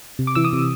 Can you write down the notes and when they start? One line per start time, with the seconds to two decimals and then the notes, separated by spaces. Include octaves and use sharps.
0.19 C3
0.27 D6
0.35 E3 E6
0.44 D#6
0.53 C3